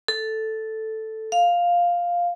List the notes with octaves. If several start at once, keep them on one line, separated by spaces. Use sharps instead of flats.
A4
F5